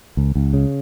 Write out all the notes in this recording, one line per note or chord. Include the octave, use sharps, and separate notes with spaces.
C#2
C#2
C#3